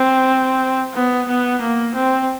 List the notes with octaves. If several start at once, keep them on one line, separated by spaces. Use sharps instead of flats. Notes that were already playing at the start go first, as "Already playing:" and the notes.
Already playing: C4
B3
B3
A#3
C4